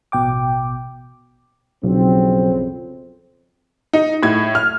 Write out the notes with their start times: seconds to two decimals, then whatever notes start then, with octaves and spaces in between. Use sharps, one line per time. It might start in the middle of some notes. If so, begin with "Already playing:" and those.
0.12 A1 B2 G5 D6
1.84 B1 F2 C#3 C4
3.93 D#4
4.23 A2 G#6
4.55 F6